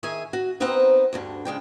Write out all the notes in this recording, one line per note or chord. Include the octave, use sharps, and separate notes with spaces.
D#3 G#4 E5 G#5
F#4
B3 C4 D#4 A#4 C5 F#5
D2 G2 D3
C#3 G#3 D4 G5